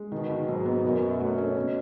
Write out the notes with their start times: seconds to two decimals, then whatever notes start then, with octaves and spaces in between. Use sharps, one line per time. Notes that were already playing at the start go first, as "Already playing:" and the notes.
Already playing: G#3
0.12 B2 D#3
0.30 D#3
0.48 G#2 F#3
0.66 B3
0.84 F#2 B2
1.02 F#4
1.20 F#2 A3
1.38 C#4
1.56 B2